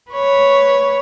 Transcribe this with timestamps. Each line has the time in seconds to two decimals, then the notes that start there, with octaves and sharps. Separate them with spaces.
0.11 B4 C#5